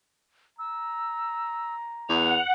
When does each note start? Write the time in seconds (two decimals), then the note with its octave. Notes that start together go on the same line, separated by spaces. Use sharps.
0.59 A#5 E6
2.09 E2 F#5 F7